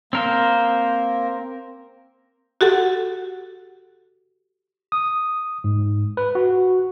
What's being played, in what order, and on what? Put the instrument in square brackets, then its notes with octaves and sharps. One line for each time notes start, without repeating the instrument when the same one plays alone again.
[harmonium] A#3 [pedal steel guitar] C4 A#4 C5
[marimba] F#4 G4 A4 F#5
[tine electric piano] D#6
G#2
B4
F#4